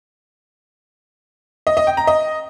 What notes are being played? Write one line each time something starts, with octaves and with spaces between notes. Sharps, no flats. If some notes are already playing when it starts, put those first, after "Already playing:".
D#5
D#5
G5
A#5
D#5